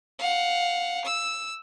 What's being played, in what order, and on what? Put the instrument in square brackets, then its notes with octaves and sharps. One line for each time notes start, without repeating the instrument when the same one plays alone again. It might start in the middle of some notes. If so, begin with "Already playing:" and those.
[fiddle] F5 F#5
E6